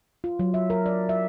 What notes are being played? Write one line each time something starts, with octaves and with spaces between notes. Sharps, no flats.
F4
F#3
E5
A#4
D5
E5